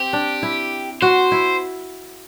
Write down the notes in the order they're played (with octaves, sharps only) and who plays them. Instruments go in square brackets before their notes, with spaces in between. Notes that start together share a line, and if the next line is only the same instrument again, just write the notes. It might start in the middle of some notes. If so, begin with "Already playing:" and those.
Already playing: [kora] C4 [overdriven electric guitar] G4
[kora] D4
E4
[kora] F#4 [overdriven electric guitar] C5
[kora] E4